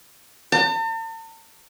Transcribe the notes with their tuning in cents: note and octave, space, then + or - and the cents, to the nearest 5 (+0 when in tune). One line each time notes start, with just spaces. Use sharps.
A5 +45